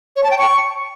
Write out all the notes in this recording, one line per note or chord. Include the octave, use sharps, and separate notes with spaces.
C#5
A5
G5
C#6